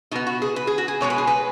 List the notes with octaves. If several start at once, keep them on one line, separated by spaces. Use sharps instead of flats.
B2 B3 D#4
F#4
G#4
B4
G#4
F#4
G#4
B2 G#3 B3 C#5
B4
G#4
B4